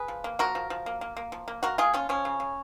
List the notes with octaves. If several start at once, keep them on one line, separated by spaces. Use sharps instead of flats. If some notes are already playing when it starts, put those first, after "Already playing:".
Already playing: G#4 B4
F3
A#3
F3 F#4 A#4
F3
F3
A#3
A#3
A#3
F3
A#3
A#3 F#4 A#4
A#3 F4 G#4
F3 C#4 F4
F3 C#4
C#3
C#3